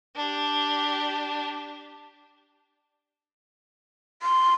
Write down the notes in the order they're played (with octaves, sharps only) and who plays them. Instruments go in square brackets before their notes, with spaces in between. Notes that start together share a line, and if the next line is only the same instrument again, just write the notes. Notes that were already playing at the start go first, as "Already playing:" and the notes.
[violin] D4 G4
[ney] C6